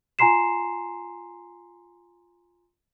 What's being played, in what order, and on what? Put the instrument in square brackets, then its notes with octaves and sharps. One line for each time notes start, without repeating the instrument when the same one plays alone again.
[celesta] F4 G#5 A#5 C6 C7 E7